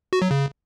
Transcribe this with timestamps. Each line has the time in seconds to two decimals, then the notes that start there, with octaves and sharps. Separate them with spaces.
0.13 F#4
0.22 F#3
0.31 C#3